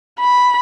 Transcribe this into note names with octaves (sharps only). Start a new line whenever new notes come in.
B5